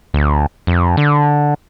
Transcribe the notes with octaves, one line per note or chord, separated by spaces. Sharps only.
D2
F2
D3